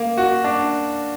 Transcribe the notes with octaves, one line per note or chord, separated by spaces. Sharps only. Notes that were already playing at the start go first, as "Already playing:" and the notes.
Already playing: A#3
F#4
D4